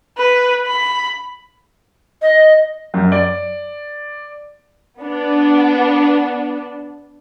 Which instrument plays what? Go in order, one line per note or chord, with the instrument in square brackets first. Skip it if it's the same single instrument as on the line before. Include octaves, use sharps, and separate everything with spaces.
[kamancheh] B4
B5
[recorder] D#5
[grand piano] F#2
D5
[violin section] B3 D4